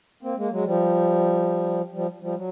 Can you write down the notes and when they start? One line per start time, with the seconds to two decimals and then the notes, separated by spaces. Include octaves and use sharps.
0.23 A#3 C4
0.37 G#3 A#3
0.51 F#3 G#3
0.65 F3 G3
1.93 F3 G3
2.22 F3 G3
2.36 F#3